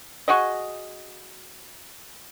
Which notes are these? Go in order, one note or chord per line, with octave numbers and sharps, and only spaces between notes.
F#4 G#4 D#5